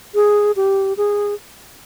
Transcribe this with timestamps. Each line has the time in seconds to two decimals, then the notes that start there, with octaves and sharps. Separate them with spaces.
0.15 G#4
0.56 G4
0.97 G#4